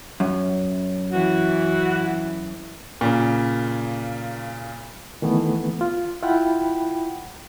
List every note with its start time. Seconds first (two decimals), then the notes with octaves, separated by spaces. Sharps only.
0.20 F#2
1.12 E3 F#4
3.01 A#2 C#3
5.22 D#3 E3 A3 B3
5.81 F4
6.23 E4 F4 F#5 G5 B5